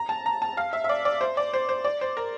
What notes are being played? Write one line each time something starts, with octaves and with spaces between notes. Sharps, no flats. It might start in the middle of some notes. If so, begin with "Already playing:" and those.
Already playing: A#5
A5
A#5
A5
F5
E5
E5
D5
D5
C5
D5
C5
C5
D5
C5
A#4